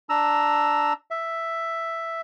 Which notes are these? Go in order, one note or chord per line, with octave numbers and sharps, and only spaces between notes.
D4 A#5 E6
E5